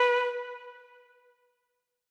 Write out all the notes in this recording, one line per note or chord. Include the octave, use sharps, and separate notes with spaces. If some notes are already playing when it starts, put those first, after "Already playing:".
Already playing: B4